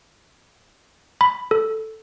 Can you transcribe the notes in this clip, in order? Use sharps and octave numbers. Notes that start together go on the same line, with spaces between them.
B5
A4